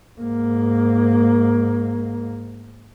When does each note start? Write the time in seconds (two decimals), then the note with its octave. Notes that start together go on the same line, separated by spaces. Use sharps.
0.20 G#2 A#3